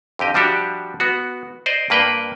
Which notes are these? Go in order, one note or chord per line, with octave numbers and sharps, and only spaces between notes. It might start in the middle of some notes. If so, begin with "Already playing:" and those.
F2 D3 G4 D#5
F3 G3 D4 F#4 G4 E5
B3 F#4
C5 D5 D#5
G2 A#3 B4 F5 G5